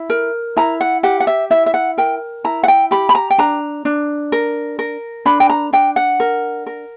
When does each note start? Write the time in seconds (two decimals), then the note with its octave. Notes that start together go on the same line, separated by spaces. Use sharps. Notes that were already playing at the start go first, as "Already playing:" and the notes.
Already playing: E4
0.10 A#4
0.56 E4 A#5
0.81 F#5
1.03 G4 F#5
1.20 F#5
1.27 E5
1.50 E4 E5
1.66 E5
1.74 F#5
1.98 A#4 G5
2.44 E4 A#5
2.63 F#5
2.68 G5
2.91 G4 B5
3.09 B5
3.15 A#5
3.30 G5
3.38 D4 A#5
3.85 D4
4.32 A#4
4.79 A#4
5.25 D4 B5
5.40 G5
5.49 A#5
5.73 D4 G5
5.96 F#5
6.20 A#4
6.67 A#4